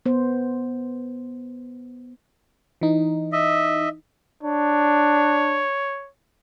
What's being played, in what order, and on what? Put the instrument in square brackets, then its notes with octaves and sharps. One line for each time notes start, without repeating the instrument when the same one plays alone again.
[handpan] B3 C5
[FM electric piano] E3 D#4
[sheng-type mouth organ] D#5 E5
[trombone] D4 [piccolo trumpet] C#5